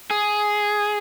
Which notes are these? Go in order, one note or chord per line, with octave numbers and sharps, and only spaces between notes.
G#4